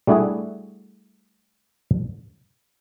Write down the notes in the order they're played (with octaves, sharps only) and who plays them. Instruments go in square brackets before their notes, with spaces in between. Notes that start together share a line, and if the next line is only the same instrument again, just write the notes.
[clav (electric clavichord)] G3 A3 D4 E4 F#4 G#4